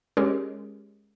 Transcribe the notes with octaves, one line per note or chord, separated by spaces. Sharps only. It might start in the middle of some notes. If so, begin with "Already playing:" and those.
G#3 C#4 G4 G#4 A#4 C#5